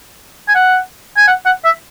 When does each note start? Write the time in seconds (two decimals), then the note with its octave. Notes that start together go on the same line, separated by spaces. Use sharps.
0.48 G#5
0.55 F#5
1.17 G#5
1.27 F#5
1.45 F#5
1.65 E5